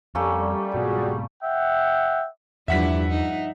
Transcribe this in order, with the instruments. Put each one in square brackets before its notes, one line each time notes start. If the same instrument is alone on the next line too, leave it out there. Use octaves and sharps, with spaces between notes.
[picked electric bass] F2 [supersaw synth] G3 [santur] A3 A#3 C#4
[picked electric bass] G#2 B2 G#3 [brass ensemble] F4 F#4 G#4
[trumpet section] E5 F#5 G5
[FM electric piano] E2 [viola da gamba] G2 F3 E4 [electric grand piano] E5 F#5 B6
[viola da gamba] D#4